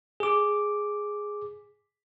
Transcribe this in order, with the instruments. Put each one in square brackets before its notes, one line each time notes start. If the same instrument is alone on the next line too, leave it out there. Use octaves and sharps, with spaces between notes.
[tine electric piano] G#4 D6